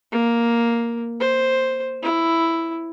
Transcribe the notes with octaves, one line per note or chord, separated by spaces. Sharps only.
A#3
C5
E4